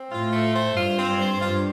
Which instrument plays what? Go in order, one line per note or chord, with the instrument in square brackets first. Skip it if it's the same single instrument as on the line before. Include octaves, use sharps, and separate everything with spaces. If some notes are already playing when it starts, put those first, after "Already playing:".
Already playing: [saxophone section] C4
[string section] A2 [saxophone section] F4
[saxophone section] A3
C5
[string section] G2 [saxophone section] F4
[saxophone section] C4
[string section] G2
[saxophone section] C5
[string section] G2 [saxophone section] F4